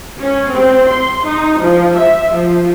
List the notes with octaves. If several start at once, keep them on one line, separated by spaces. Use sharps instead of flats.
C#4
C4
C6
D#4
F3
E5
F3